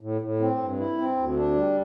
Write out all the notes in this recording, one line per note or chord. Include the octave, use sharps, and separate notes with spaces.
A2
A2
C4
G2
E4
C4
D2
D4
G3